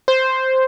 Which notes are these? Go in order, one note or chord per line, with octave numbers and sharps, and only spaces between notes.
C5